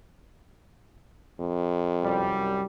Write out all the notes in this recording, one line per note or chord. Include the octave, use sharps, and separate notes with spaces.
F2
C2 F#2 G3